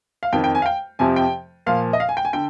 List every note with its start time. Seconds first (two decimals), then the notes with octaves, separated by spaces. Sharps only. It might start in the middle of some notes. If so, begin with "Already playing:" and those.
0.23 F5
0.33 F2 D#3 G5
0.44 G5
0.55 G#5
0.62 F5
0.66 G5
0.99 F2 C3 F3 G#5
1.16 G5
1.67 A#2 F3 F5
1.93 D#5
2.00 F5
2.09 G#5
2.17 G5
2.25 G#5
2.33 D3 G5